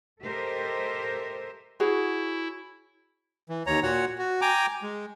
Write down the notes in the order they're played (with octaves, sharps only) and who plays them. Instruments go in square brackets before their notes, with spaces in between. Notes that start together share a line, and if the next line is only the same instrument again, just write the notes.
[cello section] G4 A4 A#4 C5 D#5 E5
[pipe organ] E4 [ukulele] F#4 G#4 C#5
[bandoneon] E3
D#2 C#5 A#5
A#2 F#4 C#5 F#5
F#4
G5 G#5 A#5 D6
G#3